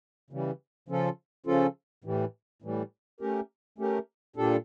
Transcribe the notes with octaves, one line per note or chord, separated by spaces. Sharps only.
C#3 E3 G3
C#3 F3 C#4 F4 A4
C#3 F3 C#4 F4 A4
A2 E3 G3
A2 E3 G3
A3 C#4 G4 A#4
A3 C#4 G4 A#4
A#2 G3 D4 A4